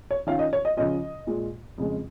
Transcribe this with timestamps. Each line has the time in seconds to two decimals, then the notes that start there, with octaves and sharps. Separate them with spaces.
0.11 C#5
0.27 D#3 C#4 F4 F5
0.39 D#5
0.53 C#5
0.65 D#5
0.77 C#3 F3 C#4 F4 D#5
1.27 A#2 G#3 F4
1.78 F2 C#3 G#3